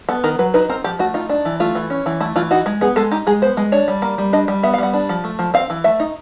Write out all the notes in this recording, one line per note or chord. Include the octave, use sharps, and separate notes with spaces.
B3 A4
D#3 A#4
F#3 B4
D#4 B4
C4 A#4
F3 G4
A3 F#4
D#4 F4
D4
E3
A3 F4
E3
C#4
E3
A3 E4
E3 F4
D#4 F#4
G#3
B3 G#4
G#3 A4
D#4 G4
G#3 G#4
B3 C5
G#3
D4 C#5
G3
A#3
G3
D4 D#5
G3
B3 E5
F5
G3 F#5
D4
F3
A3
F3
C4 F5
E3
A3 E5
D#4